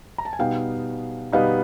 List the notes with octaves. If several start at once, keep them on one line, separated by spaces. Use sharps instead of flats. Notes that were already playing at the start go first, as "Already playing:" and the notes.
A#5
A5
G#5
B2 G3 B3 D#4 F5 G5
B2 G3 B3 D#4 D#5 F5